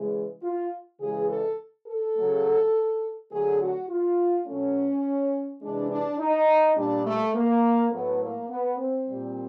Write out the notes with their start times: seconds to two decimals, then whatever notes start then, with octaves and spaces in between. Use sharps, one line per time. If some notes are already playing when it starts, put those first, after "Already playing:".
Already playing: C#3 E3 G#3
0.43 F4
1.00 C#3 E3 G#3 G#4
1.29 A4
1.88 A4
2.16 C#3 F#3 A3
3.32 D3 F#3 A3 G#4
3.61 F#4
3.88 F4
4.46 B2 F#3 A3 C#4
5.62 C3 E3 G#3 D4
5.91 D4
6.19 D#4
6.77 A#2 G3 D4
7.06 A3
7.35 A#3
7.92 A2 F#3 A3 B3
8.22 A#3
8.50 B3
8.78 C4
9.08 A#2 G3